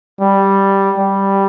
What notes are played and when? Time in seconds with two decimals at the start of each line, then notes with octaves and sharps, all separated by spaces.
0.21 G3
0.97 G3